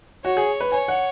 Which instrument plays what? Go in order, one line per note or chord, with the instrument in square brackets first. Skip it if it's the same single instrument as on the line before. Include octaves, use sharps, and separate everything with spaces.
[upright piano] F#4 [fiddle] C#5
[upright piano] G#4
B4
[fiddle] C#5 [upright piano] G#5
[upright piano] F#5